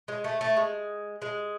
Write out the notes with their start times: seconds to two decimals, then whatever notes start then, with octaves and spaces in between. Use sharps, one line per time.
0.08 G#3
0.24 A3
0.41 A3
0.57 G#3
1.22 G#3